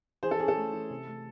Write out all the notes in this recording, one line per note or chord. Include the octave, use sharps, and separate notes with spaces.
E3 G#4 C5
A4
C#4 G#4
A4
A3
E3
C3
A3